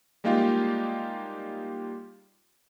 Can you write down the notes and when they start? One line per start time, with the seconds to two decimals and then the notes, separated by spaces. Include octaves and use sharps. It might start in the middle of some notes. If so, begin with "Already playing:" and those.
0.24 G3 G#3 A#3 D#4 F4 G4